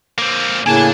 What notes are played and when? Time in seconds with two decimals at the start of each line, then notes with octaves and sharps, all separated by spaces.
0.18 A#3 C4
0.66 A2 C#3 A#3 D4 G#5 A5